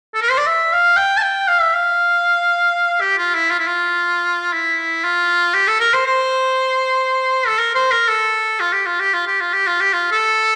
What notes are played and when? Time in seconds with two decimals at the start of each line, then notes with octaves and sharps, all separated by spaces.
0.14 A4
0.22 A#4
0.30 C5
0.38 D5
0.47 E5
0.72 F5
0.97 G5
1.17 A5
1.22 G5
1.47 F5
1.61 E5
1.73 F5
3.01 G4
3.18 F4
3.35 E4
3.51 F4
3.59 E4
3.67 F4
4.53 E4
5.04 F4
5.54 G4
5.67 A4
5.80 A#4
5.93 C5
6.06 C5
7.47 A4
7.59 A#4
7.75 C5
7.91 A#4
8.08 A4
8.60 F4
8.73 G4
8.86 F4
9.00 G4
9.14 F4
9.27 G4
9.41 F4
9.53 G4
9.67 F4
9.81 G4
9.93 F4
10.11 A4